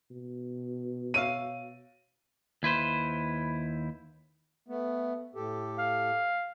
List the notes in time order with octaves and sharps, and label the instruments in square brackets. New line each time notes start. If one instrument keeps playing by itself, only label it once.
[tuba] B2
[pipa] C#5 E5 F5 [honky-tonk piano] D#7
[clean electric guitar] D#2 E4 B4 C5
[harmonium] A3 B3
A2 G4 A4
[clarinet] F5